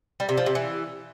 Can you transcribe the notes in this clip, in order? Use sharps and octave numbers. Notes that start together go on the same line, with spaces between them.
G3
C3
F3
C3
E3